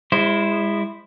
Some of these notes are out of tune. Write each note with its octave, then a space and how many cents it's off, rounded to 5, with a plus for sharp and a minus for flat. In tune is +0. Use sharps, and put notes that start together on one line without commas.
G#3 -40 E4 +5 C5 +0